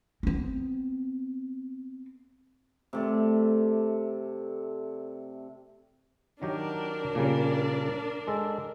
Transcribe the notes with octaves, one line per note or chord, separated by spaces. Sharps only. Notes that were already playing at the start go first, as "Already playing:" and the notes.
B3 C4
C3 A3 D5
D#3 F#3 D4 G4 A#4
A#2 C#3 G3
G#3 A4